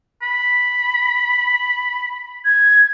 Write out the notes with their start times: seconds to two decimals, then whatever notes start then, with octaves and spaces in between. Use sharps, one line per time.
0.23 B5
2.45 G#6